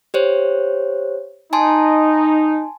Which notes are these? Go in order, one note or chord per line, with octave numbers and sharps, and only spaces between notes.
G4 C5 C#5
D#4 G#5 A5 C6